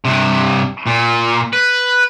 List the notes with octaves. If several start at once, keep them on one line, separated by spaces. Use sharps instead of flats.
G2 C3
A#2
B4